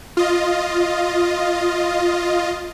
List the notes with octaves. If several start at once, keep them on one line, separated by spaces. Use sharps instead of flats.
F4 D#5